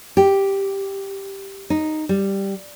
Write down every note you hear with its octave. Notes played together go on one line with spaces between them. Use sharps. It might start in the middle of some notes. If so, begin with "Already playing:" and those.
G4
D#4
G3